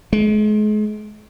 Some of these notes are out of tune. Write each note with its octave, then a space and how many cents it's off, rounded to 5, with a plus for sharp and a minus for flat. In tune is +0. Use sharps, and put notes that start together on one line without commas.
G#3 +35